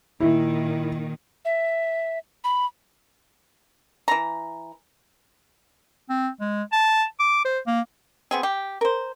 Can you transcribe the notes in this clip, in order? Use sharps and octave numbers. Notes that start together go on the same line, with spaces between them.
A#2 D#3 E4
E5
B5
E3 A#5
C4
G#3
A5
D6
C5
A#3
B3 C4 G#4
G4
A#4 C5